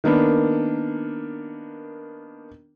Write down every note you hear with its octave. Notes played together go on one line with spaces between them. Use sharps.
D#3 A#3 B3 D4